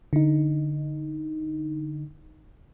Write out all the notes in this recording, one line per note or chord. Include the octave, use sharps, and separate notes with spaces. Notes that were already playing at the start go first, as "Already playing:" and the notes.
D3 D#4